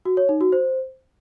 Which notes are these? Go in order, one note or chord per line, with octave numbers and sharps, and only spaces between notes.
F#4
C#5
D#4
F#4
C5